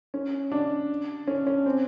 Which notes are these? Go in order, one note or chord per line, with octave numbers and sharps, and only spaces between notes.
C#4
D4
C#4
C#4
C4